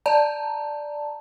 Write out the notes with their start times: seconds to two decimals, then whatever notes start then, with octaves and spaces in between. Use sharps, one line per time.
0.06 D5 A5 A#5